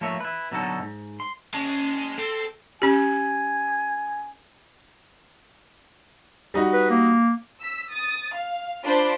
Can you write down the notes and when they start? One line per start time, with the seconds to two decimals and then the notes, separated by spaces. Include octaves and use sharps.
0.01 F3 A3 A#3 C#5 E5
0.20 E4 B4
0.52 B2 D3 F#3 D#4 F#4 A4
0.81 G#2
1.20 C6
1.54 G#3 C#4 A5
2.19 C4 A4
2.82 C#4 G4 G#5
6.54 G3 D#4 F#4
6.73 B4
6.90 A#3
7.58 E6 B6
7.90 D#6 A6
8.33 F5
8.82 D4 F4 C5 B5 D6